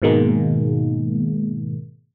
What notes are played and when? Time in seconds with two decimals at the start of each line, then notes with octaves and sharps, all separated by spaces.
0.02 G#2 B2 D#3 G#3 A#3